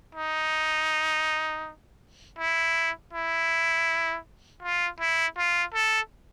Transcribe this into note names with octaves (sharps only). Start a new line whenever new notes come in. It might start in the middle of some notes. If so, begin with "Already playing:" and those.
D#4
E4
E4
F4
E4
F4
A4